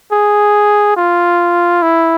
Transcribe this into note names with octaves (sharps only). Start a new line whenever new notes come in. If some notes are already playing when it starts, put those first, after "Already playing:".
G#4
F4
E4